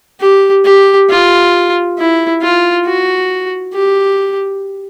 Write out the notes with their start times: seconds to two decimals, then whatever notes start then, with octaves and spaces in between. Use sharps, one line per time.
0.20 G4
0.65 G4
1.10 F4
1.98 E4
2.42 F4
2.86 F#4
3.74 G4